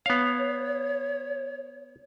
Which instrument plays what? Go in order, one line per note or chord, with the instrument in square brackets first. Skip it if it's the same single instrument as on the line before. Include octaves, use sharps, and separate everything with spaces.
[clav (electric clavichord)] B3 F5 [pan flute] C#5